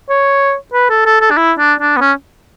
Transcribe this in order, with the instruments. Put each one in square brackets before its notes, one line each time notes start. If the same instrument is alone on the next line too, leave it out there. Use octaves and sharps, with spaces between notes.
[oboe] C#5
B4
A4
A4
A4
D4
E4
D4
D4
B3
C#4